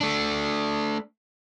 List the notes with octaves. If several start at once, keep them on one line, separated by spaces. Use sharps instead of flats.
A3 D4